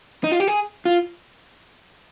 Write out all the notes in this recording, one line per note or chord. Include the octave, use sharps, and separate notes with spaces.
D#4
F4
G4
G#4
F4